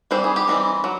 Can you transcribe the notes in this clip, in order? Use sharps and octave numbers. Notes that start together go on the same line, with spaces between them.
E3 G3 C4 C5
G#4
G4
E3 G3 C4 D#4
F#3